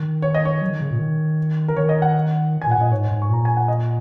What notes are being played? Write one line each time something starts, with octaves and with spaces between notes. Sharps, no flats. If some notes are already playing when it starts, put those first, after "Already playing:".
Already playing: D#3
C#5
D#5
C#5
F#3
D#3
C#3
A#2
D#3
A#4
D#3 C#5
D#5
F#5
A#2 G#5
F#5
A#2 D#5
G#2 C#5
G#2
C#6
A#2 A#5
G#5
F#5
D#5